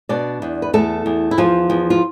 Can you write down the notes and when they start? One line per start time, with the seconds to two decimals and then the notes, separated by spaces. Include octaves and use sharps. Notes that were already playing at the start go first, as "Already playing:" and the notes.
0.09 B2 D4 D5
0.42 E2
0.62 B4
0.73 E2 A3 A4
1.06 E2
1.31 E4
1.38 E2 F3 F4
1.70 E2
1.90 F4